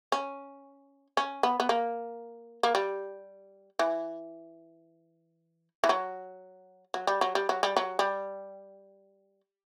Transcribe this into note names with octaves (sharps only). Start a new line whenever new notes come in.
C#4
C#4
B3
B3
A#3
A#3
G3
E3
E3
F#3
F#3
G3
F#3
G3
F#3
G3
F#3
G3